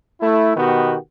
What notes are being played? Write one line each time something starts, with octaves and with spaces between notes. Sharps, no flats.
A3 E4
B2 D#3 B3 F#4 G4